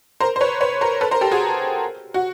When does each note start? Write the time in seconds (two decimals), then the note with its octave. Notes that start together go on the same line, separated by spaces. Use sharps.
0.20 A#4 C5
0.36 C5
0.41 B4 C#5
0.61 B4 C#5
0.81 A#4 C5
1.01 A4 B4
1.11 A#4 C5
1.21 G4 A4
1.31 F#4 G#4
2.14 F#4